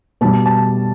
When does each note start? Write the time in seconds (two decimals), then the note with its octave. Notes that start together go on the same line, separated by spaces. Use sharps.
0.21 B2 G3 A5
0.46 A5